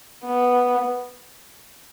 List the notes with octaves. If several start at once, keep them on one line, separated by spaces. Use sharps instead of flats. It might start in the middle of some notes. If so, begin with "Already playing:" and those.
B3